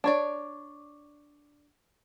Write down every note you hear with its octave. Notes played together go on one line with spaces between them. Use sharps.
D4 C#5 D5